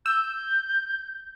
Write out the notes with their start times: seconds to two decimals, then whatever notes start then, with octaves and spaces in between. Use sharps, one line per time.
0.06 E6 G6